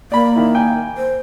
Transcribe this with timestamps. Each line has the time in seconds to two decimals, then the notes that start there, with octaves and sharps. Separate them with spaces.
0.12 A#3 D5 B5
0.36 D#3 E4
0.55 G5 G#5
0.97 C5